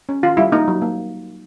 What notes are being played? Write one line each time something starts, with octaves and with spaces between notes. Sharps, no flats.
C#4
D#3 F4
G3 E4
A#3 D#4
F#3
A#3